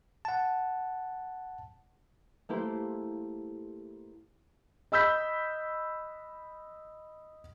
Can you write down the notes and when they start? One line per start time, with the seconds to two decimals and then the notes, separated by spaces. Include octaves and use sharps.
0.25 F#5 A5
2.49 A3 A#3 E4 G4 C5
4.92 D#5 B5 E6 G6 B6